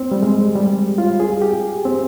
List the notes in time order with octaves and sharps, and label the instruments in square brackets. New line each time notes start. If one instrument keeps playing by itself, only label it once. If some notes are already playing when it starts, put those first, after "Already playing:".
Already playing: [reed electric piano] C4
G3
G#3
G3
F4
G#4
G4
C4